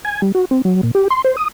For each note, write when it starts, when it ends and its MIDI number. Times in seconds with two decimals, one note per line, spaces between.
0.05 0.22 80
0.22 0.32 55
0.35 0.45 66
0.51 0.61 60
0.65 0.81 54
0.83 0.91 46
0.95 1.08 67
1.10 1.22 84
1.24 1.36 72
1.37 1.48 87